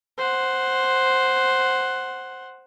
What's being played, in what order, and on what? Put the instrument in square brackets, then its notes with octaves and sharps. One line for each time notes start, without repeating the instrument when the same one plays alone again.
[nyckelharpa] C5 F#5